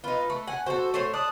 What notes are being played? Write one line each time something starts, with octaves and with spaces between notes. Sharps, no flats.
D#4 F4 B4
A3
F#5 G#5
F#4 A4 C5
A3 C5 C#5
D5 A5 D#6 F#6